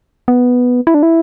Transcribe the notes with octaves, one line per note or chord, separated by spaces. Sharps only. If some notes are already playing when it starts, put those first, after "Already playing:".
B3
E4
D4
E4